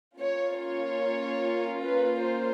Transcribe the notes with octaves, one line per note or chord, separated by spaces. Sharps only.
A#3 C#4 F4 C#5
C#5
B4
C5